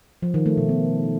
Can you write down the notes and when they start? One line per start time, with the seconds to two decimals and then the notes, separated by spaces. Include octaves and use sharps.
0.22 F3
0.34 D#3
0.46 A3
0.57 B2
0.69 B3